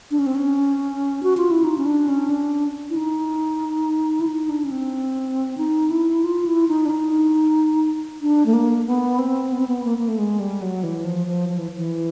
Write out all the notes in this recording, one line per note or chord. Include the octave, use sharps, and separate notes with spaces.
D4
C#4
C4
C#4
F#4
F4
E4
D#4
C#4
D4
C#4
D4
E4
D#4
E4
D#4
D4
C#4
C4
D#4
E4
F4
E4
D#4
D4
D#4
D4
A3
A#3
B3
C4
B3
C4
B3
A#3
A#3
A3
G#3
G3
F#3
E3
F3
F3
F3
E3
E3